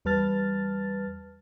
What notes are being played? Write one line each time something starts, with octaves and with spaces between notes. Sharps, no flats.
E2 G3 B4 A5 F6 A6